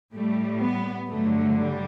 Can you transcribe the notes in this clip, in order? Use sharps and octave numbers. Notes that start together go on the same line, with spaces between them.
A2 G3 A3
B3
G2 D3 F#3 A3
G3